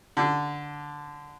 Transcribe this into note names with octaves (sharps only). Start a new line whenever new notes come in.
D3